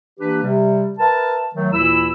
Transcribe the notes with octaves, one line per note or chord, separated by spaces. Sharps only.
E3 A#3 D4 G4 B4
C3 G3
A#4 B4 E5 A5
D#3 F#3 A3
D#2 A#2 E3 E4 B5 E6